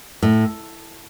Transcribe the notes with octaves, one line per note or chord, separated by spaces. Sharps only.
A2